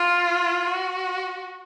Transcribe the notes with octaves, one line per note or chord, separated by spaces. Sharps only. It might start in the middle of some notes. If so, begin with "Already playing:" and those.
Already playing: F4
F#4